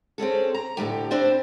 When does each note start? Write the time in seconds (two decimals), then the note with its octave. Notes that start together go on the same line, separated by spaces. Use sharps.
0.18 C4 C#4 G#4 A4
0.54 A#5
0.77 D2 A2 D#3 G4
1.11 C4 D4 B4 C5 D5